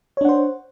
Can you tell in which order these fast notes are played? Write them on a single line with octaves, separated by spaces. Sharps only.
C#5 D4 F#5 C5